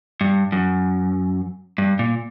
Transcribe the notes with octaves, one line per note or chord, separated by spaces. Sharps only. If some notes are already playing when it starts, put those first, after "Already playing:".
G2
F#2
G2
A#2